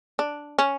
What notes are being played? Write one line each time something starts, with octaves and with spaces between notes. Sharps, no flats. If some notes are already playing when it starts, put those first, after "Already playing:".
D4
C#4